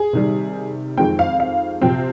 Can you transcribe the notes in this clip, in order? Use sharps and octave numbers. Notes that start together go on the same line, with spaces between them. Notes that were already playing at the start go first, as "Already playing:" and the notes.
Already playing: G#4
C3 D#3 G3
F2 D#3 G#3 C4 G5
F5
F5
C3 F3 C4 G5